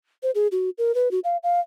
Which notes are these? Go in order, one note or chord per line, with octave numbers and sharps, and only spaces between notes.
C5
G#4
F#4
A#4
B4
F#4
F5
F5